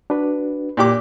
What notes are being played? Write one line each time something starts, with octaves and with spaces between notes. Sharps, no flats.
D4 F#4 B4
A#2 G4 D6